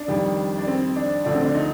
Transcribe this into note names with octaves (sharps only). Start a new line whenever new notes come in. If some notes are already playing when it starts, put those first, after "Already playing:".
Already playing: D4
F2 D#3 G3
D4
C4
D4
D2 D3 F3 D4
C4
D4
D#4